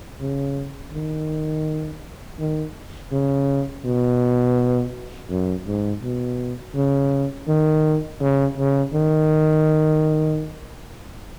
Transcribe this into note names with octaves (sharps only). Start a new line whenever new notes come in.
C#3
D#3
D#3
C#3
B2
F#2
G#2
B2
C#3
D#3
C#3
C#3
D#3